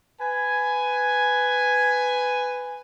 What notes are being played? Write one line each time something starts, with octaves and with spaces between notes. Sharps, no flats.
B4 G#5